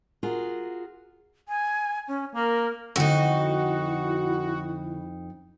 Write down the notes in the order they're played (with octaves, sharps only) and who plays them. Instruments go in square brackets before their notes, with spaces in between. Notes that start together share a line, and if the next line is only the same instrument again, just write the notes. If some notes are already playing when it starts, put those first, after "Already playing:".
[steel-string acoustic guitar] F4 F#4 G#4 A#4
[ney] G#5
C#4
[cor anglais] A#3 [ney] A#4
[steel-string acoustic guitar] F2 D#4 [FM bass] D3 [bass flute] E4 [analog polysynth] F#4